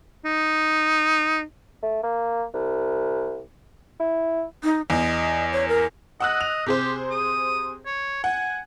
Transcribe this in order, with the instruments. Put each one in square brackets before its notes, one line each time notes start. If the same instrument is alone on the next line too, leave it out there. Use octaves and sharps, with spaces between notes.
[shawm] D#4
[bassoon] A3
A#3
C2
E4
[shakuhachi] D#4
[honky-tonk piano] E2 [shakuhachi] D#5
[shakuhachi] C#5
A#4
[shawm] D#5 [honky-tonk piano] F#5 E6 F#6
[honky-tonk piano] F7
[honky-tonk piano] C3 G#4 C5 [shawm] G4
[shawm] D#6
C#5
[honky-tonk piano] F#5 [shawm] G#5